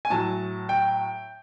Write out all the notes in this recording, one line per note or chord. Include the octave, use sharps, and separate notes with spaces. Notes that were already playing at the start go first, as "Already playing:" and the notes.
G#5
A2 F#3 A5
G5